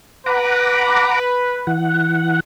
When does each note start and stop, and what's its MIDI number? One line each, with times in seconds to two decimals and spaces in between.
0.26 1.72 71
0.26 1.19 78
0.26 1.19 82
0.26 1.19 86
1.67 2.40 52
1.67 2.40 78